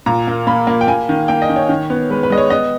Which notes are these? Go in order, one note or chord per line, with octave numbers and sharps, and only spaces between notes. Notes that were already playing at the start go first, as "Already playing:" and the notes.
A#2 A#5
A#3
A#3 B5
A#3
G5
A#3 G#5
D#3
A#3 G5
D#5
D#3
C#5
D#3
B3
G#3 B4
B4
G#3 D#5
C#5
B3 D#5